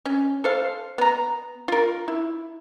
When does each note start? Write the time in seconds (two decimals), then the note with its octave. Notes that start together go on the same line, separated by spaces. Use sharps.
0.05 C#4
0.44 A4 C5 F5
0.98 B3 A#5
1.68 F4 A#4
2.08 E4